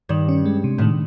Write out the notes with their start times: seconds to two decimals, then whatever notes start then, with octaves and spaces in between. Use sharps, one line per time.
0.09 G2 D#3
0.29 C#4
0.46 G#3
0.64 C3
0.78 A2
0.82 D#3